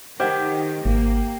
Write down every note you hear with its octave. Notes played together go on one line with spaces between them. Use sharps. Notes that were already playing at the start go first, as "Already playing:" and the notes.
D#3 G4 C5 D#5 F#5
G#1 A#3